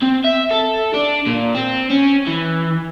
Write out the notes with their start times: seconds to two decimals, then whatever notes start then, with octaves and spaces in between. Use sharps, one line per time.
0.03 C4
0.25 E5
0.51 A4
0.94 D4
1.27 A#2
1.55 C4
1.90 C#4
2.27 E3